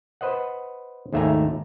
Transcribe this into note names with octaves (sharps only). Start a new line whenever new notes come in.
B4 C5 D#5 F#5
D#2 G#2 A3 E5 G#5 A#5